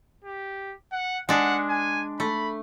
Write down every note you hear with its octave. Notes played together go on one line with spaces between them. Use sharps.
G4
F#5
G#3 D4 F#5
G#5
A3 B5